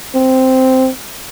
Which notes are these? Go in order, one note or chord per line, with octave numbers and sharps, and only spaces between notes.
C4